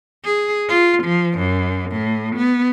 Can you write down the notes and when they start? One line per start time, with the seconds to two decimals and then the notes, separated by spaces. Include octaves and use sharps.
0.25 G#4
0.69 F4
1.03 F3
1.39 F#2
1.91 A2
2.36 B3